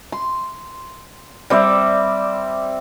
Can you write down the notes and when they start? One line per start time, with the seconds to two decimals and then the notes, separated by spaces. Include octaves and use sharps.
0.12 C6
1.50 G3 C4 D5 E5